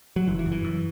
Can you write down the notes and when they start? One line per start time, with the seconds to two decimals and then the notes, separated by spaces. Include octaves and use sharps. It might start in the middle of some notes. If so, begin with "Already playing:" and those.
0.16 F#3
0.27 F#1 E3
0.39 E3
0.46 F#2
0.52 E3
0.64 F#2